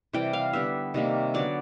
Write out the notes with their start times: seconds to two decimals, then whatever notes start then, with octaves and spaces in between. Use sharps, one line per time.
0.13 C3 E3 G3 G5
0.33 F5
0.53 D3 G3 B3 E5
0.94 C3 D#3 G3 A#3
1.34 D3 F#3 B3 D5